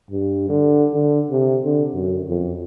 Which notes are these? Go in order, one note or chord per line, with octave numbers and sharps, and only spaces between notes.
G2
D3
D3
C3
D3
F#2
F2